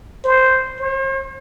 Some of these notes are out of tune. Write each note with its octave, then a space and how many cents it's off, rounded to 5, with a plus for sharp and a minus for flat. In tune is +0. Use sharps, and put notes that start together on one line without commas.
C5 -5
C5 +45